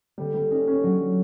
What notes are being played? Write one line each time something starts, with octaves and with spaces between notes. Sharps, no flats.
D3 G3
G3
C#4 D#4
C#4
F#3 D4